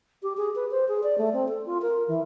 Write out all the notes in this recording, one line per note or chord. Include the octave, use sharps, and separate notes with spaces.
G4
G#4
B4
C5
G#4
D5
A3
C4
A4
F4
A#4
E3